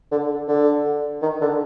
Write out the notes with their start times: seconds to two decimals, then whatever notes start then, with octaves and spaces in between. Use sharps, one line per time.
0.11 D3
0.48 D3
1.22 D#3
1.41 D3